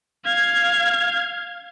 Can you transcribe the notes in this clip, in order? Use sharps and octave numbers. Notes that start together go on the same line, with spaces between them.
F5 G#6